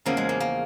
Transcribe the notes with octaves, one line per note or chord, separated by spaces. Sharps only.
E2 C#3 F3 A#3
G#3
A#3
A#3